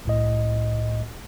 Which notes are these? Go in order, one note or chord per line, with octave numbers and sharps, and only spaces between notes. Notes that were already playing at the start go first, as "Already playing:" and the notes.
C2 A2 D#5